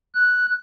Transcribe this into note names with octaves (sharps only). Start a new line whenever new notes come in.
F#6